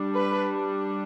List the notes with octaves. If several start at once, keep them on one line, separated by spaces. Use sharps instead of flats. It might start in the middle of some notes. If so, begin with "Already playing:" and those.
Already playing: G3 D4
B4